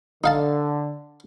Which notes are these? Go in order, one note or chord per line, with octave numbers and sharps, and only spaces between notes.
D3 D#4 F5 A5